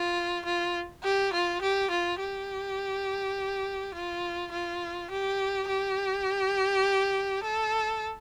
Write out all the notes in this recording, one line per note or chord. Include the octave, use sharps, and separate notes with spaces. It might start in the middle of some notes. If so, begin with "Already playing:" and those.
Already playing: F4
F4
G4
F4
G4
F4
G4
F4
F4
G4
G4
A4